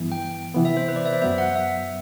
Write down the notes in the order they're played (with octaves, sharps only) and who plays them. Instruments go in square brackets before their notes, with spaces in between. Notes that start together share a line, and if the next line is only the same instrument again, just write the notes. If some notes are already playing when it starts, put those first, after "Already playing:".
Already playing: [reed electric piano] G2 E3 B3
[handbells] G5
[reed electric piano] C3 E3 B3
[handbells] E5
C5
B4
D5
E5
C5
[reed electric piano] F#2 F#3 B3 [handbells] E5
[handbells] F#5
E5